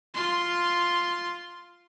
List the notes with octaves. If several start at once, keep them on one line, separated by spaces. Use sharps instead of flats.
F4 C6